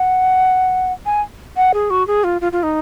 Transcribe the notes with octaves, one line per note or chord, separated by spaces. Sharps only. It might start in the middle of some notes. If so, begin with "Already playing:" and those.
Already playing: F#5
G#5
F#5
G#4
F#4
G#4
F4
F4
F4
D#4